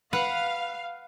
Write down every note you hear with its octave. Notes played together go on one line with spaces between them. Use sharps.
B4 F5 F#5